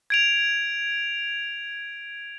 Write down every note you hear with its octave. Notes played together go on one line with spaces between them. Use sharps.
G#6 D7 F7